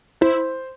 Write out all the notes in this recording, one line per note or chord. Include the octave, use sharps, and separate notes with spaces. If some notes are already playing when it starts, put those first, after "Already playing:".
E4 C5